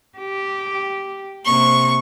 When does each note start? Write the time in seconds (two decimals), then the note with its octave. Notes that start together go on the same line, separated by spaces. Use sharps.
0.18 G4
1.45 C3 A#3 C#6